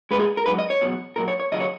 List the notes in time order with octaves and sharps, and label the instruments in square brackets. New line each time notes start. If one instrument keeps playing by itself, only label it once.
[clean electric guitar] G#3 B4
A#2 G#4
A#4
G#2 F#3 B4
D#5
C#5
E2 B2 F#3
A#2 F#3 A#4
C#5
C#5
D#2 C#3 F#3 D#5
C#5